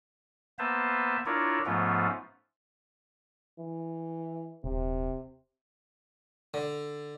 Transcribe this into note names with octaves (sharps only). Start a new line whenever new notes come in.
A#3 B3 B4 C5 E5 A5
D4 E4 F4 A#4 C#5 D5
G#2 F3 A3 B3 C#4 F4
E3
D#1 C3
D3